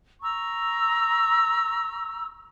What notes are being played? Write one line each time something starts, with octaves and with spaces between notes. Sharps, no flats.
A#5 C#6 E6